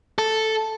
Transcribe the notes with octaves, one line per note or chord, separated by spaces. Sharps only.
A4